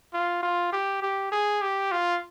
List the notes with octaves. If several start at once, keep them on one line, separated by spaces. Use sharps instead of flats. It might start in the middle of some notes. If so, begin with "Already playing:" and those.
F4
F4
G4
G4
G#4
G4
F4